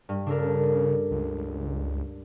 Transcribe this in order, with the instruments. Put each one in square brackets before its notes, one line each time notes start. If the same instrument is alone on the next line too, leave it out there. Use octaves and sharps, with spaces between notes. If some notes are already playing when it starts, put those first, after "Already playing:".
[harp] G2
[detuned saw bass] C#3 [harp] D4 A4 A#4
[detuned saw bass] C#2